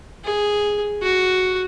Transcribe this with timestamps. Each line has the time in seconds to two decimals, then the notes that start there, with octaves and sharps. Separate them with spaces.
0.25 G#4
1.02 F#4